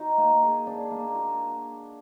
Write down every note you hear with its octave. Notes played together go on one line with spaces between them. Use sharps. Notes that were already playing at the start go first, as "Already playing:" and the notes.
Already playing: D#4 F#4
A#3
G#4
D4
A#3
F#4